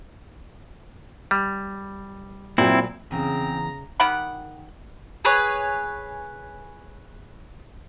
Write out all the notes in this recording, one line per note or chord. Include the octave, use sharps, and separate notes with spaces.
G3
A#2 F#3 C4 E4
E2 C#3 C4 A#5
D#3 G4 F#5 B5
G#4 B4 C#5